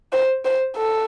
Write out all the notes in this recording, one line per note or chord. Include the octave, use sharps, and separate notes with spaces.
C5
C5
A4